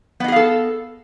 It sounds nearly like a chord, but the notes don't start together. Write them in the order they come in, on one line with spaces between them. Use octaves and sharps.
B3 D#5 G#4 F5 A4